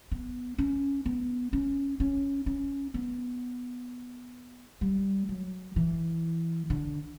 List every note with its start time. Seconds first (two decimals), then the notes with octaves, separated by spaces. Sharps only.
0.11 B3
0.58 C#4
1.06 B3
1.53 C#4
2.00 C#4
2.46 C#4
2.94 B3
4.81 G3
5.29 F#3
5.76 E3
6.70 D3